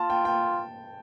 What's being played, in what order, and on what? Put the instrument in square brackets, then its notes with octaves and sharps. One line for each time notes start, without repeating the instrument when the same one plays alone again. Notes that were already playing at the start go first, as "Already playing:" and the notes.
Already playing: [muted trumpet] F4 [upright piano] A5
[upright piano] G5
G5